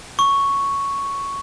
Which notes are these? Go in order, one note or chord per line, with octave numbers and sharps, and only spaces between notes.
C#6